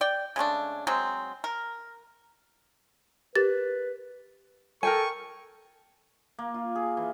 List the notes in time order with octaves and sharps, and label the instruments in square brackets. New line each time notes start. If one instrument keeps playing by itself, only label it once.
[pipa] D5 G5
C#3 G#3 A3 D4
F#3 G#3 C4
A#4
[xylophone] G4 A#4 A6 [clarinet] B4
[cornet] A4 [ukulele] A#4 G5 G#5 [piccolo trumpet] C#6
[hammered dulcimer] A#3
F4
G#4
E3